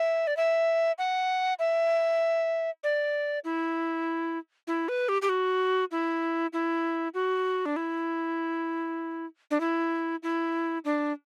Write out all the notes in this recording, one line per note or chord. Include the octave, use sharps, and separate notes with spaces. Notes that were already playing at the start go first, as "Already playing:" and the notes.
Already playing: E5
D5
E5
F#5
E5
D5
E4
E4
B4
G4
G4
F#4
E4
E4
F#4
D4
E4
D4
E4
E4
D4